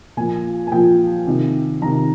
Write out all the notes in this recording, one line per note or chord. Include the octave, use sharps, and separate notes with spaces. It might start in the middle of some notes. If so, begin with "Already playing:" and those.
A#2 F3 G#5
G#5
A#2 F3 G5
C3 D#3
C3 D#3 A#5